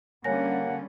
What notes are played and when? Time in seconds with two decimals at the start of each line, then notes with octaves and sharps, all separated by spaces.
0.24 D3 G3 A#3 C#4 C#5 F#5 G#5 A#6